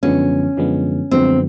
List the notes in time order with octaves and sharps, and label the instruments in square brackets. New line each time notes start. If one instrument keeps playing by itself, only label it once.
[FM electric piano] F#2 D3 F3 G#3 B3 [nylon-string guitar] C#4
[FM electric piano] F#2 D3 F3 G#3 B3
[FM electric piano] F#2 D3 F3 G#3 B3 [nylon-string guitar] C4